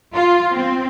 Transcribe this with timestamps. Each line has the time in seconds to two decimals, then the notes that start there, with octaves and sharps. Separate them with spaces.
0.13 F4
0.53 C4